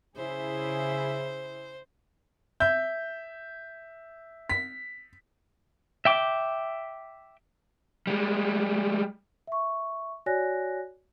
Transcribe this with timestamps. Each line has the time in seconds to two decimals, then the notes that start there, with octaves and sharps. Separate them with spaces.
0.17 C#3 E4 G#4 C5
2.60 E5 G6
4.49 B6
6.05 E5 G5 D6
8.07 G3 G#3
9.47 E5 C#6
10.26 F#4 C#5 D5 G#5 F#6 A#6